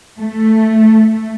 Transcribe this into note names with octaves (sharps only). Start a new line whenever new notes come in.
A3